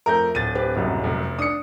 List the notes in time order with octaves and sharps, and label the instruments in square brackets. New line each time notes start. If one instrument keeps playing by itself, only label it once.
[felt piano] F2 A3 [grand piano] A#4 G6
[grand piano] D1 A6 [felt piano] D#7
[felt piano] C4 G4 B4
F#1 C2 F#2
[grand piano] F1
[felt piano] D4 [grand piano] D#6 C#7